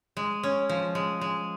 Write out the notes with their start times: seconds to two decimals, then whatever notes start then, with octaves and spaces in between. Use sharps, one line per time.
0.17 G#3
0.43 C#4
0.69 F3
0.95 G#3
1.21 G#3